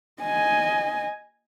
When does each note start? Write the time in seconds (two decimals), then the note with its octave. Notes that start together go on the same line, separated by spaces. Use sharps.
0.23 D#5 G#5